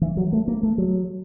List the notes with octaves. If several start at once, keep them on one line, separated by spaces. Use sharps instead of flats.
E3
F#3
A3
A#3
A3
F#3